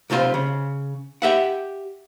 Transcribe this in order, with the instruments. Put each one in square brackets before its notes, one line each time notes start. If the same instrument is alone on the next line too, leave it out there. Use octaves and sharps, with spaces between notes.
[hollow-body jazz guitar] B1 C3 F4 F#4 C5
C#3
G4 E5 F#5